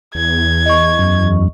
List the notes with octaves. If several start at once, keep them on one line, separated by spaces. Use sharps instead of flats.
E2 G#6
D#5 C#6
F#2